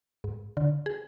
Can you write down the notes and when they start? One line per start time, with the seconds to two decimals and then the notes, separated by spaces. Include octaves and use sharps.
0.24 G#2
0.57 D3
0.86 G#4